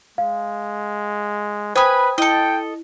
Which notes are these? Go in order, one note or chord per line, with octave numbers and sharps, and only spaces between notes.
G#3 F5
B4 C5 G5 G#5 B5 D#6
E4 A4 D#5 G5